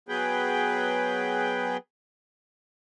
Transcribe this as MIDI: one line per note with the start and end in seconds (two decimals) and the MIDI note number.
0.09 1.77 54
0.09 1.77 59
0.09 1.77 68
0.09 1.77 71
0.09 1.77 79